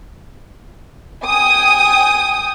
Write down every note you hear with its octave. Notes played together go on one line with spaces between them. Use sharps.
G5 G#5 D#6